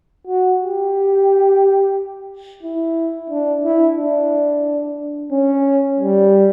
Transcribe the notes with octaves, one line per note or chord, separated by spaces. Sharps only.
F#4
G4
E4
D4
E4
D4
C#4
G3